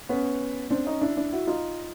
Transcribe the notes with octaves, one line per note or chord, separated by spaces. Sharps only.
B3 C#4
C4 D4
C#4 D#4
D4 E4
D4 E4
E4 F#4
D#4 F4